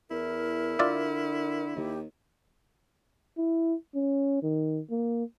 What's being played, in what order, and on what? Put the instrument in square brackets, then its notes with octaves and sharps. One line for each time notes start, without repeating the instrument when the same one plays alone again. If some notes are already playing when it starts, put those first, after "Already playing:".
[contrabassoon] E2 [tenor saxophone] E4 [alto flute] A#4
[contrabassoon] D3 [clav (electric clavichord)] F4 D5 E5
[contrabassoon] D#2 [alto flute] G4
[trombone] E4
C#4
D#3
A#3